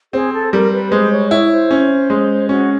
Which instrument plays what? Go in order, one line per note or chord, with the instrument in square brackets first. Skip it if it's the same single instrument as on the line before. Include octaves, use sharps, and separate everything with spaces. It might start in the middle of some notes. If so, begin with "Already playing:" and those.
[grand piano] C4 [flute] G#4
[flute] A4
[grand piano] G3 [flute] A#4
[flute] B4
[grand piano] G#3 [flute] C5
[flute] C#5
[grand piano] E4 [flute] C#5
[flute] C5
[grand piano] C#4
G#3
[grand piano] C#4 [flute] F#4